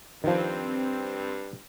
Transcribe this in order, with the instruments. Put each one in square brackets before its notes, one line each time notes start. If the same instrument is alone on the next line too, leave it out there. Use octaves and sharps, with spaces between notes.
[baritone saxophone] G2 [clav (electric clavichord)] D#3 F3 [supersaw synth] C4